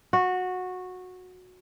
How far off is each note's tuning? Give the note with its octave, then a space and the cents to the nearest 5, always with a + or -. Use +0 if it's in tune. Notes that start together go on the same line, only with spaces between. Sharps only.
F#4 -15